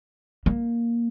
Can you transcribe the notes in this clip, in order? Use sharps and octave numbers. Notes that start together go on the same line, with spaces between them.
A#3